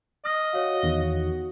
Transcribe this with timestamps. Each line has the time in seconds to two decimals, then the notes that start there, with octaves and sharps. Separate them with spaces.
0.25 D#5 D#6 F6 A#6
0.53 F#4 C#5 F5
0.83 E2 D#3